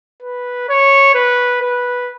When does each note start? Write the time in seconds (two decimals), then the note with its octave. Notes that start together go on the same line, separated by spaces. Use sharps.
0.22 B4
0.69 C#5
1.15 B4
1.62 B4